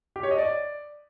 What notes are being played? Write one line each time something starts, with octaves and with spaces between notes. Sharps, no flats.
G4
C#5
D#5
D5